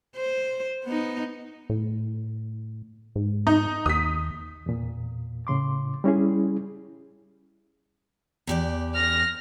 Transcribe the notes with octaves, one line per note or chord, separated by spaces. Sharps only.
C5
B3 D#4
A2
G#2
D#4
D#2 D#6 B6
E2 A#2
A2 C#3 C6 D6
G3 C#4 E4 G#4
E2 G4 D5
F6 A#6